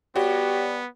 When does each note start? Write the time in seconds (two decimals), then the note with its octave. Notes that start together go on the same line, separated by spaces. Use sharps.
0.16 G3 B3 F#4 G4 C#5